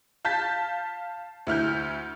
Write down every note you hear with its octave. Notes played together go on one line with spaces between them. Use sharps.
F5 A5 G6 A6 B6
D2 E4 F6 G6